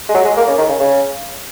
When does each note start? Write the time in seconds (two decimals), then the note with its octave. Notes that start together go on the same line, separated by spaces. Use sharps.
0.09 G#3
0.14 F#3
0.25 G#3
0.37 A#3
0.47 C#3
0.58 D#3
0.69 C#3
0.80 C#3